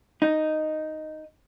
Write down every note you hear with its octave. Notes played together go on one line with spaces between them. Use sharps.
D#4